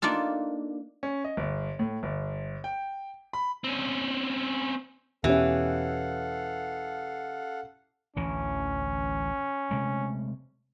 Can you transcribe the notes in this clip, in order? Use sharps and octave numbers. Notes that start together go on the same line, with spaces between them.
A#3 D4 D#4 F4 A4
C#4
D#5
G1
A2
G1
G5
B5
C4 C#4
E2 B2 E3 C#4 G4 A4 F5 F#5
A1 D2 E3 C#4
C3 G#3 A3